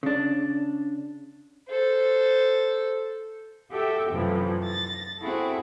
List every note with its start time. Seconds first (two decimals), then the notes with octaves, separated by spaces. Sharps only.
0.03 C#3 D4
1.68 A4 C5
3.70 F#4 G4 A4 E5 G5
4.10 F#2 A2 C3 E3 F3
4.63 A6 A#6
5.19 C4 E4 F#4 G#4 A4